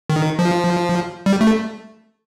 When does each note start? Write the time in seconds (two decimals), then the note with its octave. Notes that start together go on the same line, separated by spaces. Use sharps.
0.10 D#3
0.39 F3
1.26 G3
1.41 A3